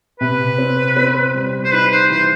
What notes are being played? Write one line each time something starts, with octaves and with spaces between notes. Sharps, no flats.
C3 B4
C4
C4
G3
C5
D#4 B4
C5
E3 C5